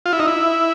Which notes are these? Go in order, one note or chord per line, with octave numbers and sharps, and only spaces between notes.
F4
E4
D#4
E4